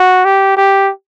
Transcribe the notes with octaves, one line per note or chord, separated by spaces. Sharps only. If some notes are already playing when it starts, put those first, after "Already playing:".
Already playing: F#4
G4
G4